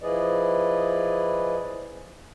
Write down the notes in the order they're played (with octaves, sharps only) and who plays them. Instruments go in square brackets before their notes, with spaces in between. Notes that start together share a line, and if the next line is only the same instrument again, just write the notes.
[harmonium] F3 E4 G#4 B4 D5 D#5